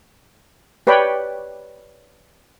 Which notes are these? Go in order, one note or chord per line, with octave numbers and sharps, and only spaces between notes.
G4 B4 C#5 D5 G5 B5